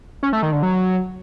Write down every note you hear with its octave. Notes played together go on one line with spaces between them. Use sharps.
C#4
A3
D#3
D3
F#3